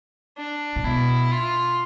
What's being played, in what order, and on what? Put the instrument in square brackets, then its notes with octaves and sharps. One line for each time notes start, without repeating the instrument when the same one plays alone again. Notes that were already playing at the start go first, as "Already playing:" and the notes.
[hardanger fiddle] D4
[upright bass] A#2
[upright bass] B2 [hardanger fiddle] E4
[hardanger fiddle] F4